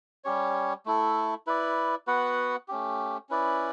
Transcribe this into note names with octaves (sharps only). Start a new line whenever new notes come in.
G3 C#4 G4 C#5
A3 E4 A4
E4 B4 D5
B3 F#4 B4 F#5
A3 C#4 G4
C#4 E4 B4 D5